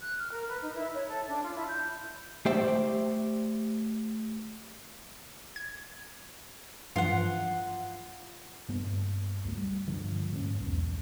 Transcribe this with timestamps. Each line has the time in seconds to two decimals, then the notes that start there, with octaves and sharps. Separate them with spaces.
0.01 F#6
0.18 F6
0.32 A#4
0.48 B4
0.62 D#4
0.76 E4
0.93 C#5
1.08 A4
1.28 D4
1.43 F4
1.56 E4
1.67 G6
2.45 A3 G4 C5 D5 E5 G5
5.56 G#6
6.96 G2 E3 F3 F4 F#5
8.68 G2 A#3 B3
9.45 C#2 A3
9.57 G3
9.87 G2 D3 F3
10.32 G#2 A#3 C4 C#4
10.60 B1 E2